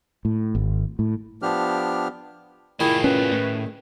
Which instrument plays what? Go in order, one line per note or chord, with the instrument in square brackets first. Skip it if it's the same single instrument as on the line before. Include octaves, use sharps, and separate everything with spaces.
[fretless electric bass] A2
G#1
A2
[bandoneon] F3 B3 D4 G4 F6
[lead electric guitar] A2 F4 [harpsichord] D#3 G#4 [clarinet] E4
[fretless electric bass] C#4 [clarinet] B4
[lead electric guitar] A2